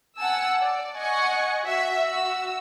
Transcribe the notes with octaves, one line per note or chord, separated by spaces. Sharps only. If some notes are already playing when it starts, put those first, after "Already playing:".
F#5 G#5 A5 E6
D5
D#5 F#5 G#5 C#6
F#4 E5
F#4 E6